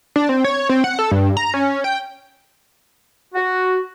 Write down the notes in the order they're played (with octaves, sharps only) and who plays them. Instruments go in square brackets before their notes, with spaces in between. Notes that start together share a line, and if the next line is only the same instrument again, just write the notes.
[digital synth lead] D4
C4
C#5
C4
F#5
A4
G2
A#5
C#4
G5
[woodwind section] F#4